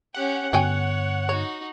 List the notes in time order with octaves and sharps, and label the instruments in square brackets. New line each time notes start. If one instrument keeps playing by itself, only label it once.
[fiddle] C#4 G4 [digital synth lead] F#5
[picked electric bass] G2 D3 B3 [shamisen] F#4 G5 G#5 [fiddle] C#5
[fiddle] D#4 F#4 [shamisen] C#5